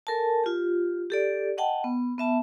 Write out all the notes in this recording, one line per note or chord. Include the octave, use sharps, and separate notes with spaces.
A4 A#4 G#5 A5
F4 G4
G4 A4 D5
D#5 F#5 G5 A5
B3
B3 E5 A5